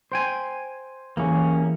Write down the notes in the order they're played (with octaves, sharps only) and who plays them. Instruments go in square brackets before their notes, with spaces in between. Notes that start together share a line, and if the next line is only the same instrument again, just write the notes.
[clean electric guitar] C5 G5 G#5
[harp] E3 G4 G#4 [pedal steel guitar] A#3 C#4